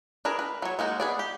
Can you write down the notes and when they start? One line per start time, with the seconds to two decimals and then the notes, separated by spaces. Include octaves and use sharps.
0.25 D4 G#4 A#4 B4
0.39 B4
0.62 F#3 C#5
0.79 G#3 A#3 D#4 F#4
1.00 B3 G#4 D5
1.19 G4